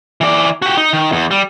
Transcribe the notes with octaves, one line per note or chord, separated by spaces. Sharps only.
E3 D5
F#4 G4
D#4
D#3
E2
G3